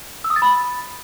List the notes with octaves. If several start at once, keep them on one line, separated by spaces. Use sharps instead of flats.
E6
D#6
A6
B5